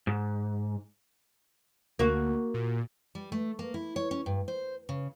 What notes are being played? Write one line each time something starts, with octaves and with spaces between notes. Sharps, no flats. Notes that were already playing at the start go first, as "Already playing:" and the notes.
G#2
D2 A#3 F#4
A#2
G3
A3
A#3
E4
C#5
C#4
G2
C5
C#3